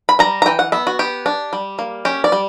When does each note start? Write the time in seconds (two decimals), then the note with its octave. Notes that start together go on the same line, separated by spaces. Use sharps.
0.09 B5
0.19 G3 A#5
0.42 A#5
0.46 E3 G5
0.59 F#5
0.72 B3 E5
0.87 F#4
0.99 B3 G4
1.26 D4
1.53 G3
1.79 A#3
2.05 C#4 G4
2.24 D5
2.32 G3